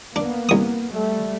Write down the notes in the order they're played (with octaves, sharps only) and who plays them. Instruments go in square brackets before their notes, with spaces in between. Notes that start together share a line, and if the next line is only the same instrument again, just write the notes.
[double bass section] A#3 B3 [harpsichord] D4
[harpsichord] C2 D#6
[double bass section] G3 A3